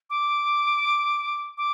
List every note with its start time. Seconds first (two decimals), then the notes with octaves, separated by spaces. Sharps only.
0.10 D6
1.58 D6